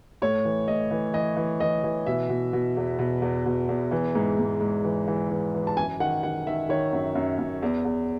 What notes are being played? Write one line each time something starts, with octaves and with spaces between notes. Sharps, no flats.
A2 C#5
E3
A2 D#5
E3
E3 D#5
E3
E3 D#5
E3
B2 E5
B2
B2
E2
B2
E2
B2
E2
E3
G#2
G#2
G#2
E3
E3
E3
E3
A5
F#2 G#5
D#3 F#5
D#3 F#5
D#3 E5
D#3 C#5
F#2
F#2
F#2
E2
E2